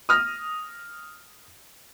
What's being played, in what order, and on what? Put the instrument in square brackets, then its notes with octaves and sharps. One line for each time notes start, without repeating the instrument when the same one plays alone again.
[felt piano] D#6 F6 A#6